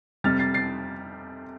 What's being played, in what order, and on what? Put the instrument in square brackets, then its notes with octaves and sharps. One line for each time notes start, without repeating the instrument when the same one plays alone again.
[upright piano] F2 C3 G3 F6 A6
A6 C7
A6 C7